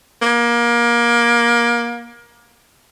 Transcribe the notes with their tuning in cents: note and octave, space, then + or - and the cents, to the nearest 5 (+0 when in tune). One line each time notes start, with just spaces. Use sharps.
A#3 +25